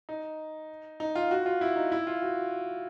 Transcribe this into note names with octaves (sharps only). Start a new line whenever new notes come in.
D#4
D#4
F4
F#4
F4
E4
D#4
E4
F4
F#4